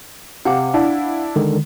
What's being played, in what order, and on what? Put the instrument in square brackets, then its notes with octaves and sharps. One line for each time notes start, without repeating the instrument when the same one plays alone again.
[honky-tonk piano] C3 [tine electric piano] F5 F#5 D6
[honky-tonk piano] D4 E4
[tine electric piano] D3 D#3 G#3